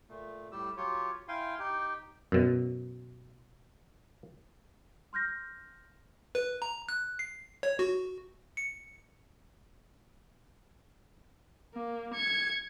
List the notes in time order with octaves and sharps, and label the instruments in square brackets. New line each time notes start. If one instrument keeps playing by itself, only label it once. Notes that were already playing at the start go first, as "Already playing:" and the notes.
[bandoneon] A#2 A3
A2 G3 G4 E6
F#3 F4 G4 C#5
E4 F5 G5 G#5 C6
D#4 G4 G5
[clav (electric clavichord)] F#2 B2
[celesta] C6 F6 G6 A#6
[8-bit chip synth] B4
A#5
F#6
C7
C#5
F#4
C#7
[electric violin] A#3
G#6 C#7